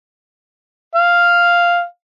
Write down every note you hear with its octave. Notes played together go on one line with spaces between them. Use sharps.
F5